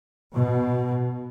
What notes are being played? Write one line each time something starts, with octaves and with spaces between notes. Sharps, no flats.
B2